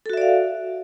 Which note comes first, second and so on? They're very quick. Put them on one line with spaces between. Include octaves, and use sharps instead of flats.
A4 F#4 E5 D5 F5